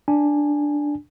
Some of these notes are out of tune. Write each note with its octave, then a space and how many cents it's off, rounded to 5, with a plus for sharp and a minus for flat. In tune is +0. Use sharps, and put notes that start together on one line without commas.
D4 +0 G#5 -10